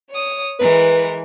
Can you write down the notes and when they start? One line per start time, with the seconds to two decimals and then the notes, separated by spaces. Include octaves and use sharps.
0.10 C#5 D#6
0.59 E3 G#3 A#4 B4